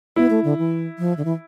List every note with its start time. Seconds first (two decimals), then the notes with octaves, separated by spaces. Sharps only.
0.16 B3 E4
0.30 A3
0.44 D3
0.58 E3
0.99 F3
1.17 D3
1.25 E3